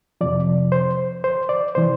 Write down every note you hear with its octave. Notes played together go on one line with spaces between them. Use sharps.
F2 C3 F3 D5
C5
C5
D5
C3 E3 C5